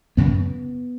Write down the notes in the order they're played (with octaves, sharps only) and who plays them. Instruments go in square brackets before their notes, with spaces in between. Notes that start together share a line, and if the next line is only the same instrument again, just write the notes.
[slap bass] F#2 C#3 B3